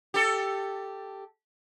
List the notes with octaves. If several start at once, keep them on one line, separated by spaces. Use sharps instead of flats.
G4 A4